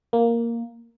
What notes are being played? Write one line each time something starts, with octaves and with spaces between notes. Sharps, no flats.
A#3